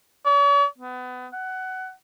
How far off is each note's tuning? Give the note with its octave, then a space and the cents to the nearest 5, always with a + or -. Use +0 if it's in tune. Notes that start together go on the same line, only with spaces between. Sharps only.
C#5 +45
B3 +30
F#5 +20